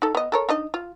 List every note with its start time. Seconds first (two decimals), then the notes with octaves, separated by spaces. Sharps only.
0.02 D#4 A4
0.15 B3 D#5
0.32 A4 A#4 C#5
0.49 D4 D#4 D#5
0.74 F4